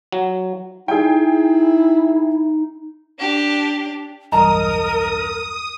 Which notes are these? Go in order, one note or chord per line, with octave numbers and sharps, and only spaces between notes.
F#3
D#4 E4 G#4 G5
D4 G4
B1 E2 G2 A#4 D#5 A5 A#5 D#6